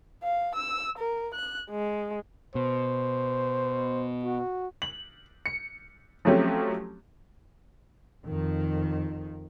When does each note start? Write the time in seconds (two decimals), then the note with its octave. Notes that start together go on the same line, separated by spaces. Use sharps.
0.23 F5
0.55 E6
0.98 A#4
1.34 F#6
1.70 G#3
2.55 B2 C5
4.24 F#4
4.82 F#7
5.46 C#7
6.25 F3 F#3 A3 C4 C#4 G4
8.26 F2 D#3